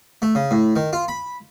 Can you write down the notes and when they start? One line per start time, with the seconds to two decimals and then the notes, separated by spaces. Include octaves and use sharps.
0.22 A3
0.35 C#3
0.51 A2
0.76 D#3
0.93 F4
1.08 B5